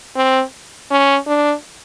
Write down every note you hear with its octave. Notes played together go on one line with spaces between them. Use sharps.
C4
C#4
D4